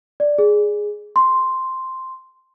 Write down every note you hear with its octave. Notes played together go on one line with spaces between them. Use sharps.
D5
G#4
C6